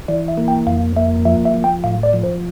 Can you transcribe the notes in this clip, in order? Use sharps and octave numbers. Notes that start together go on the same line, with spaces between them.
E3 D5
E5
A#3
G5
F2 F5
A#3 E5
F3 E5
E5
F3
G5
A2 F5
D5
F3
C5